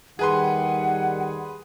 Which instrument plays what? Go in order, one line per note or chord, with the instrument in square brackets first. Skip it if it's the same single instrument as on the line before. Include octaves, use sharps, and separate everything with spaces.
[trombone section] D#2 D#3 G3 [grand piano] G#4 B4 C6 [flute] F#5